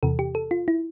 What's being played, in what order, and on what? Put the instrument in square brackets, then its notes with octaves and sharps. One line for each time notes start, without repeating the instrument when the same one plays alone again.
[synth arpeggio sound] E2 C3 E3 A4
G4
A4
F4
E4